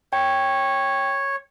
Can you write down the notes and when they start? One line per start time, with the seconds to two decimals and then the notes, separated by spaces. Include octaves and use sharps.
0.13 C#5 G5